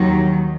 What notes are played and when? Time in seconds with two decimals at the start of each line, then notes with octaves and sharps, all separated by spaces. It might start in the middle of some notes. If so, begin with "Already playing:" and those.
Already playing: D#2 D#3 F#3